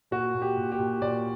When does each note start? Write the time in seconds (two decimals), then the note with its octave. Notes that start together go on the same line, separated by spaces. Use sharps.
0.11 A#2 F#4
0.34 A#2
0.42 G4
0.57 A#2
0.72 G4
0.79 A#2
1.02 A#2 D5